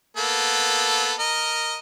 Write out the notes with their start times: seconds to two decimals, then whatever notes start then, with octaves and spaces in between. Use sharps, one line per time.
0.17 A#3 B3 A4
1.20 A#4 D#5